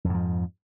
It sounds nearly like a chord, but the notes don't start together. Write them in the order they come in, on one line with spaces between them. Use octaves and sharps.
F2 G#2 F3